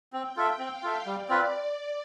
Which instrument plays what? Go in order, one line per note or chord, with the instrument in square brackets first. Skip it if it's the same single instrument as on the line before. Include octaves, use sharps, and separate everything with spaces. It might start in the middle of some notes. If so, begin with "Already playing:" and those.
[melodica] C4 [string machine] G5
[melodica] F4 A4 E5
[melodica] C4 [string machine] F5
[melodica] F4 A4 E5
[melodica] G3 [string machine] D5
[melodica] C4 F4 B4